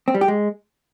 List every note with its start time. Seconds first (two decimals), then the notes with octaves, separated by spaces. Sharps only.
0.08 C4
0.14 G3
0.21 G4
0.28 G#3